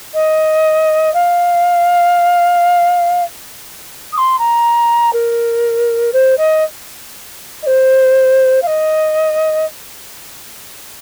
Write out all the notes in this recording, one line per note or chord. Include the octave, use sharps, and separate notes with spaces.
D#5
F5
D#6
C6
A#5
A#4
C5
D#5
D#5
C5
F5
D#5